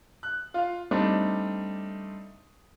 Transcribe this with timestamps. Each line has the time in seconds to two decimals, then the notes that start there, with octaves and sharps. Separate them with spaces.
0.23 F#6
0.54 F4 F5
0.91 G3 A3 C4 D4 D#4